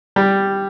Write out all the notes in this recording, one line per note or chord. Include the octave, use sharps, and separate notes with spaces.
G3